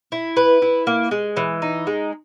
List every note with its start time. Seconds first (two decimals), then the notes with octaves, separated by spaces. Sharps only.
0.12 E4
0.37 B4
0.62 E4
0.87 A#3
1.11 G#3
1.37 E3
1.62 D#4
1.87 G#3